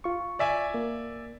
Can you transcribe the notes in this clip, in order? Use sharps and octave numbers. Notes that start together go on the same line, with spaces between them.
F4 C#6
D5 E5 G#5
A#3